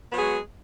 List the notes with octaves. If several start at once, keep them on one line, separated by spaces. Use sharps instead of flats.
F#3 G#3 B3 F#4 G#4